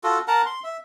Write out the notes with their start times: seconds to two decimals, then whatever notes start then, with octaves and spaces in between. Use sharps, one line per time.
0.04 F4 F#4 A4
0.28 A#4 F#5 A5 A#5
0.46 C6
0.64 E5